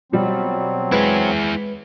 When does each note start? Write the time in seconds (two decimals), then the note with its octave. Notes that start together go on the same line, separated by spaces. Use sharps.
0.12 B2 F#3 G3 C4 F4
0.92 G#3 E4 G#4 B4 G#6